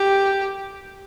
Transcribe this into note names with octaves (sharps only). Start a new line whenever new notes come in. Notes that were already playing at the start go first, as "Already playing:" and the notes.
Already playing: G4